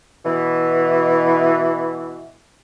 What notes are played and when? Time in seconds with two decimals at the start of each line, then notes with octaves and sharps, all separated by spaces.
0.24 B2 E3